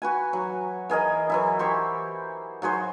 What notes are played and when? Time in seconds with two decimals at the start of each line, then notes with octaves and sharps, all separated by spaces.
0.02 F#4 B4 G#5
0.33 F#3
0.90 E3 G#4 A#4 D#5
1.30 E3 F#3 E4
1.59 G4 C5 C#6
2.62 F#3 F#4 G#4 C5